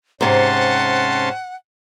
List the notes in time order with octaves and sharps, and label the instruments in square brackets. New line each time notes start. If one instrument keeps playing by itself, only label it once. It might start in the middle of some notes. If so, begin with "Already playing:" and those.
[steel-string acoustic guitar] G#2 C3 [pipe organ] C#4 A5 C6 [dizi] F#5